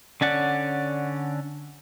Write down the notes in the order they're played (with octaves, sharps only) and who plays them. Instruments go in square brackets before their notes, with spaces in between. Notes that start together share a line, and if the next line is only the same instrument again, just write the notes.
[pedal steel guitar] D3 C#4 D5 F#5